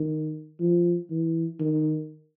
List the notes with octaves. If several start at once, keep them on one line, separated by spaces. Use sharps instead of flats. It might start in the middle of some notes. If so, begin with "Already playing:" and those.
Already playing: D#3
F3
E3
D#3